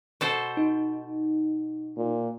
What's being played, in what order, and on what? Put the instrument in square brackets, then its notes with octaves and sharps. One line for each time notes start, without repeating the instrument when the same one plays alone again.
[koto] B2 A4 C5
[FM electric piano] D#4
[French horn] A#2